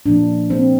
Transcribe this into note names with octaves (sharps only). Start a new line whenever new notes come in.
A#2 F3 A#3 D4
C4